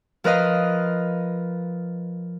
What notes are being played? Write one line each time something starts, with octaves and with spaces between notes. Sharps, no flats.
F3 A#4 B4 D#5 F5